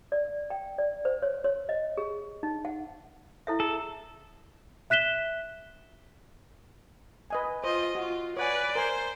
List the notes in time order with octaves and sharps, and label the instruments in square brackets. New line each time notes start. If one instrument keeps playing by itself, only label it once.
[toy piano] D5
G5
D5
C5
C#5
C#5
D#5
G#4
D#4
F#5
E4 A4 E5
[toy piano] G#4 [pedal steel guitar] A4
[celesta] E5 F#6 B6 E7 G7
[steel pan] B4 D#5 G#5
[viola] F4 D#5 [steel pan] C5
[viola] F4 [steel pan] F#4
[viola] B4 D5 [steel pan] C#5 F#5 G#5
[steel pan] A#4 G#5 C6 [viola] C5